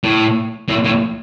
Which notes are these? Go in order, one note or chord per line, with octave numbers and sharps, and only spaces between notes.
A2
A2
A2